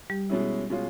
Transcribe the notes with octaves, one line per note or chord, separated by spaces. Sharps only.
G3 G4
B2 G#3 C#4 E4
B2 G#3 C#4 F4